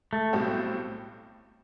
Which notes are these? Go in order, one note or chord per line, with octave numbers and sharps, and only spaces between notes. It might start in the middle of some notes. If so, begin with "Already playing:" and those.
A3
B1 A2 G3 C4